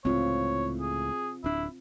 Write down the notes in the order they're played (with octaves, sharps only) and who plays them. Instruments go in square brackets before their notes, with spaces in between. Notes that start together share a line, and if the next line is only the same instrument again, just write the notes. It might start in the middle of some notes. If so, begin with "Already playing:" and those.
[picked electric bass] C#2 A2 [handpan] C4 F4 [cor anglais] C#5
[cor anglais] G#4
[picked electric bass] D1 D4 [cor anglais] E4